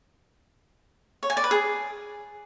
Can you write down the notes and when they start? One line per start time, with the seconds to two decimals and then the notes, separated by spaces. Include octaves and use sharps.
1.23 C#5
1.30 G#5
1.37 D5
1.44 B4
1.51 G#4